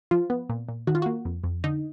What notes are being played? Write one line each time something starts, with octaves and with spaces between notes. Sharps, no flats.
F3 F4
B3
A#2
A#2
D#3 F#4
F4
A#3 F#4
F2
F2
D3 D#4